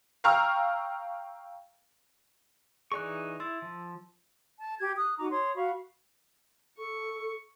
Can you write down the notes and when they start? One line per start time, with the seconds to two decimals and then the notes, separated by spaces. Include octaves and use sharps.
0.24 F5 G5 A#5 C#6 E6 F6
2.92 E3 D#4 G#4 D5 C#6 F#6
3.40 E4 C6 E6 A6
3.62 F3
4.60 A5
4.80 G4 G#6
4.98 D#6 F#6
5.19 D#4 F#4 A#5 D6
5.31 C#5 C6 D#6
5.56 F#4 F5 B5 C#6
6.79 A4 C#6